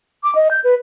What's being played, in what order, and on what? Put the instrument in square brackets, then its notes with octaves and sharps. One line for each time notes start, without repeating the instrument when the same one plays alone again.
[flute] D6
D#5
G6
B4